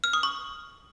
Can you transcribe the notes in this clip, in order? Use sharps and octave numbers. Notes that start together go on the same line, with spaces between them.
F6
D#6
C#6